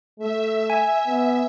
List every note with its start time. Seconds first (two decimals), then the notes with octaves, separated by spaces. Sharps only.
0.19 A3 E5
0.70 G#5
1.07 B3